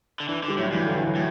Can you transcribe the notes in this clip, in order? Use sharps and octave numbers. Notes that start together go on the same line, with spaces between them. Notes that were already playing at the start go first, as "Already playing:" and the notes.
D3
E3 D4
D3
G3
A2 F#3
G2 E3
D3
E3
F#3
A2